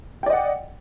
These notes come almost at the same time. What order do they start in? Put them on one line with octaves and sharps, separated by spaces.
G5 D5 D#5 F#5